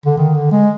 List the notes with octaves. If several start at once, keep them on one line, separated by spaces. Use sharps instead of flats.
D3
D#3
D3
G#3